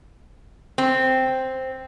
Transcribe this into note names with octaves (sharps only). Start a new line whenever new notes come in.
C4